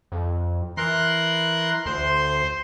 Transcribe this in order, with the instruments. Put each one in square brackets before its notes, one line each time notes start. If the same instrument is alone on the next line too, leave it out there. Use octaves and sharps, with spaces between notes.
[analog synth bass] F2
[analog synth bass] E3 [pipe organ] A#4 C6 F#6
[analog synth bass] D2 [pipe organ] C5 C6